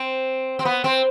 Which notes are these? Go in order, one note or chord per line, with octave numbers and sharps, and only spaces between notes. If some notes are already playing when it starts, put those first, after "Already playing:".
Already playing: C4
C4
B3
C4